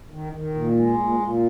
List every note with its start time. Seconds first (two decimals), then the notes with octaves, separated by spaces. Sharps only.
0.11 D#3
0.33 D#3
0.54 A#2
0.76 G#3
0.98 A#2
1.19 A#2